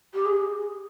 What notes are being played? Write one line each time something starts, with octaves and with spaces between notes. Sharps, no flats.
G4
G#4